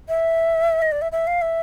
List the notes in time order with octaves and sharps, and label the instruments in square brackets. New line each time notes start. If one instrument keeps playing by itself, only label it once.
[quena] E5
D#5
D5
E5
E5
F5
E5